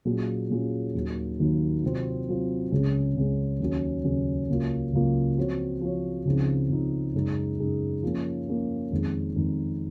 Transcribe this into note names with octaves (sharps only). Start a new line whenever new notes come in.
A#2 F#3 C#4 F4 G#4
A#2 F#3 C#4 F4 G#4
D#2 D#3 F#3 A#3
D#2 D#3 F#3 A#3
C3 F#3 C4 F4
C3 F#3 C4 F4
C#2 C#3 G#3 C#4
C#2 C#3 G#3 C#4
D#2 C#3 F#3 C#4
D#2 C#3 F#3 C#4
C#2 C#3 F#3 A#3 F4
C#2 C#3 F#3 A#3 F4
F3 C4 F#4 C#5
F3 C4 F#4 C#5
C#2 C#3 F3 C4 D#4
C#2 C#3 F3 C4 D#4
F#2 C#3 G#3 D#4 G#4
F#2 C#3 G#3 D#4 G#4
F3 A#3 C#4
F3 A#3 C#4
F2 D#3 G#3
F2 D#3 G#3